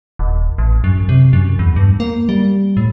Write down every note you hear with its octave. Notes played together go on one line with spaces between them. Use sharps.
D#1
A1
F#2
C3
F#2
E2
G2
A#3
G3
A2